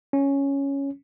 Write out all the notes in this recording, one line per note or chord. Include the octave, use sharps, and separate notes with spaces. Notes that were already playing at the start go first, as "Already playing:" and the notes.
C#4